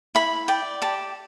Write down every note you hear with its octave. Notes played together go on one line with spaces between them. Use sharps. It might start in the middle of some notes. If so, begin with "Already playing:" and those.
E4 B5
D5 G5
G4 A5